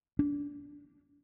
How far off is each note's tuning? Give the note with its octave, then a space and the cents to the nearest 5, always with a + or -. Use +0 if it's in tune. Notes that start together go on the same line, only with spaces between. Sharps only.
D4 -25